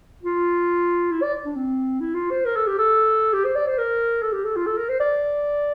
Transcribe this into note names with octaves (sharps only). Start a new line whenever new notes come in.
F4
E4
D5
D4
C4
E4
F4
C5
A#4
A4
G4
A4
G4
C5
D5
C5
A#4
A4
G4
A4
F4
A4
A#4
C5
D5